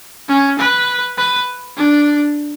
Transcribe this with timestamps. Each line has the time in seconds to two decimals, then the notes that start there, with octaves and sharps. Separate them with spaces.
0.29 C#4
0.59 B4
1.17 B4
1.77 D4